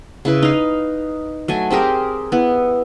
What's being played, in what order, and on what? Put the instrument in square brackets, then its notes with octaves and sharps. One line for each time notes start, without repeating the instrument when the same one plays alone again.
[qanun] C#3 E4 B4
D#4 F5
F#3 A3 G#5
C4 G4 G#4 A#4
B3 E4